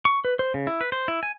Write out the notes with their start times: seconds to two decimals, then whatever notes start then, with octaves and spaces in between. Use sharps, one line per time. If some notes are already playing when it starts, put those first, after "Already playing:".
0.05 C#6
0.25 B4
0.39 C5
0.54 C#3
0.67 E4
0.81 B4
0.92 C5
1.08 E4
1.23 G#5